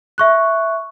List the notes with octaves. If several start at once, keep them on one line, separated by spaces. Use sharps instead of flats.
E5 C#6 F#6